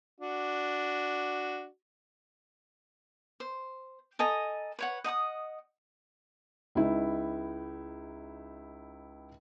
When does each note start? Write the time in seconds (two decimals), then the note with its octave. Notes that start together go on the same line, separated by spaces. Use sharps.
0.20 D4 F#4
3.40 C5
4.19 A4 D#5 G#5 A#5
4.79 B4 C#5 F#5
5.04 D#5 F#5 A#5 D#6
6.75 C#2 D#4 E4